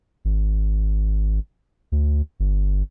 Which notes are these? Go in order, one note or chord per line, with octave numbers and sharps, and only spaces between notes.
G#1
D2
G1